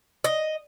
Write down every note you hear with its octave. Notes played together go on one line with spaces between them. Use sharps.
D#5